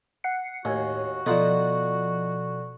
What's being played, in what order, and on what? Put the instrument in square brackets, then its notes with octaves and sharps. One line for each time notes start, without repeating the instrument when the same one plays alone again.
[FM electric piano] F#5 C7 C#7
[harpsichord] D#2 [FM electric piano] A2 C#5 G#5 [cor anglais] F#4
[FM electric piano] B2 F3 [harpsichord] D#4 F4 F#5 [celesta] A4 D5